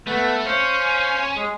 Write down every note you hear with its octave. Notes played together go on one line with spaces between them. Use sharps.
A3 B3 A4 B4
C#4 C5 F5
G#3 G#4